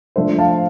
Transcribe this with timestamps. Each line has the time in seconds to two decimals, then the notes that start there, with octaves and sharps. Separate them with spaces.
0.16 F3 A3 D4 C5 E5
0.38 F5 A5